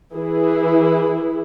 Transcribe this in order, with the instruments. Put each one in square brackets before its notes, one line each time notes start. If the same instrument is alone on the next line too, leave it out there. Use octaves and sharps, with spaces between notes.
[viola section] E3 E4 G#4